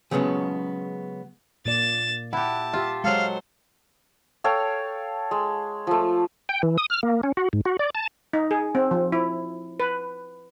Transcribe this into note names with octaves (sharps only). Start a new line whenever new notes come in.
C#3 F#3 G#3 B3 C#4
A#2 A#3 D5 A6 E7
E4 G4 F#5 A5
F4 G4 E5
F#3 G#3 A4 C5 F5
A4 C#5 F5 G5
G#3
F3 A3
G5
E3
D#6
F6
A#3
C#4
F#4
G#2
F#4
D5
A5
D#4
G#4
C4
F3
E4
B4